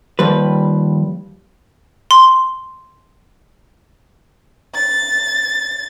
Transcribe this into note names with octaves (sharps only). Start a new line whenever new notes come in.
D#2 F3 G3 B4
C6
A6